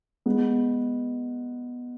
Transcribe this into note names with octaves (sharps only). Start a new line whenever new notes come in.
G#3 B3